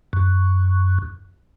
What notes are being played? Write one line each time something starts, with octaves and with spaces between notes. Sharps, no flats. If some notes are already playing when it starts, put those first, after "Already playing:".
F#2